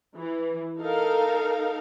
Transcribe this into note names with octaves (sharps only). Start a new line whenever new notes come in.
E3
D#4 A4 A#4 F5